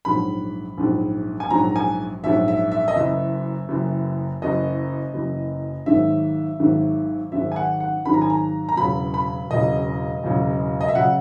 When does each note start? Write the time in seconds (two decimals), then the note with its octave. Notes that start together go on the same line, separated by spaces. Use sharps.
0.05 A#1 G#2 F#3 B5
0.78 A#1 G#2 F#3
1.40 G#5
1.50 A#1 G#2 F#3 A#5
1.76 G#5
2.23 A#1 G#2 F#3 E5
2.48 E5
2.72 E5
2.88 D#5
2.96 F#1 F#2 E3 E5
3.69 F#1 F#2 E3
4.42 F#1 F#2 E3 D#5
5.14 F#1 F#2 E3
5.86 G#1 G#2 D#3 F#3 E5
6.60 G#1 G#2 D#3 F#3
7.32 G#1 G#2 D#3 F#3 E5
7.52 G#5
7.56 F#5
7.80 F#5
8.05 G#1 G#2 D#3 F#3 B5
8.14 A#5
8.22 G#5
8.30 A#5
8.69 A#5
8.77 E1 E2 C#3 F#3 B5
9.14 B5
9.50 E1 E2 C#3 F#3 D#5
10.23 E1 E2 C#3 F#3
10.81 D#5
10.88 E5
10.95 C#3 F#3 F#5